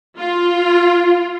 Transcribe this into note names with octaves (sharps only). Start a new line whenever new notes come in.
F4